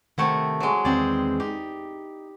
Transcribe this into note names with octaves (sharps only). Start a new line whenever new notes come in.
C3 D#3 A3 E4 F#5
F#3 G#3
E2 D#3 C4 G#4 D5
D#4 G4